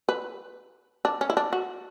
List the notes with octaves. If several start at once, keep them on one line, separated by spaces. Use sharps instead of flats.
B4
D4
C#4
E4
D4
F#4